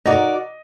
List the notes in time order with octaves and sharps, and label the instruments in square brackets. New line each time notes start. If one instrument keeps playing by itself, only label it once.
[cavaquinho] D#4 F#4 A#4 D5 [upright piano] D#5